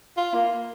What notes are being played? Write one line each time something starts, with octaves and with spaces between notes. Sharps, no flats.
F4
A#3